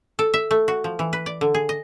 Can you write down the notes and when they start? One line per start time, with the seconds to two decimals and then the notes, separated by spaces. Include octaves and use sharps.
0.19 A4
0.34 E5
0.51 A3
0.68 F#4
0.84 F3
0.99 E3
1.13 B4
1.26 D5
1.41 D3
1.54 G#4
1.69 D#5